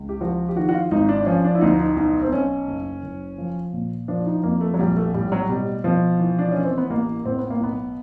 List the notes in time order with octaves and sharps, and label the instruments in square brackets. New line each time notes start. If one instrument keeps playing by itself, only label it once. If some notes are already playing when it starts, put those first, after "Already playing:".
Already playing: [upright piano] C#2
G4
F3 F#4
G4
D#3 F#4
F#4
F4
G#1 D#4
D4
F3 C#4
D4
E4
D2 D#4
D#4
B1 D#4
C4
B1 C#4
F#1
F#1
F3
A#2
F3 D4
D#4
F2 A#3
A3
F#3
A#1 G3
A3
A2 G3
F#3
B2 G3
B2 F3
E3
D4
E3 C#4
C4
B3
A1 A#3
A2 C4
B3
A#3
B1 B3